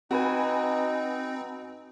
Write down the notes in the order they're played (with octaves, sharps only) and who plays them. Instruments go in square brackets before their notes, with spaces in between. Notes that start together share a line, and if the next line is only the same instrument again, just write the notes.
[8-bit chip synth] C4 [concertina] D#4 [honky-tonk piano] F#4 B4 G#5